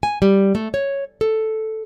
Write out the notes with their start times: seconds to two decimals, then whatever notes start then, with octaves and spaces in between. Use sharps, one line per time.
0.03 G#5
0.22 G3
0.55 A3
0.74 C#5
1.21 A4